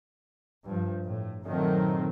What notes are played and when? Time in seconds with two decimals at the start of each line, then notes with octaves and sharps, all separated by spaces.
0.65 G2 F3
1.03 A2
1.45 A#2 D#3 F#3 A3 C4